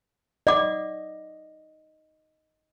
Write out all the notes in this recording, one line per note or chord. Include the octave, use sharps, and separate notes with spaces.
D5 D#5 F#5 D6